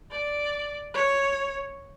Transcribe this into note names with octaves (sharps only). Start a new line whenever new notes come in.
D5
C#5